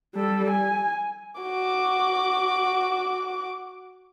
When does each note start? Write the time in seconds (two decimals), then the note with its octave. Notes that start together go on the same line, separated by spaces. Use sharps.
0.15 G3 A4
0.51 G#5
1.40 F#4 D6